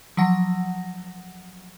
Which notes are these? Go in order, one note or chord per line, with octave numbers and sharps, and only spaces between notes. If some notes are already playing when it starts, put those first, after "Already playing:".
F3 F#3 F#5 A#6